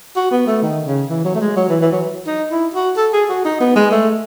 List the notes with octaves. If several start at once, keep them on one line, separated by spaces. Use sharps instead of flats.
F#4
B3
A3
D#3
C#3
E3
F#3
A3
G#3
F#3
E3
E3
F#3
D#4
E4
F#4
A4
G#4
F#4
D#4
B3
G#3
A3